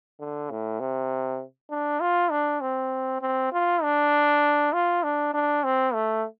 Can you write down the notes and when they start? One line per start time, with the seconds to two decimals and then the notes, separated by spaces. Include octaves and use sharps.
0.19 D3
0.50 A2
0.80 C3
1.70 D4
2.00 F4
2.31 D4
2.61 C4
3.21 C4
3.52 F4
3.83 D4
4.73 F4
5.03 D4
5.34 D4
5.64 C4
5.93 A3